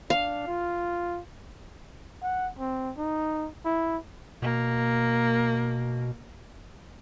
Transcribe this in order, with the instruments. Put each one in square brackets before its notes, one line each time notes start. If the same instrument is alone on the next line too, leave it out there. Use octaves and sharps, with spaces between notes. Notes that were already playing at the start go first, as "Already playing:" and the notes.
[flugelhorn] D4 [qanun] F5
[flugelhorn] F4
F#5
C4
D#4
E4
[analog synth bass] B2 [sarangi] A#3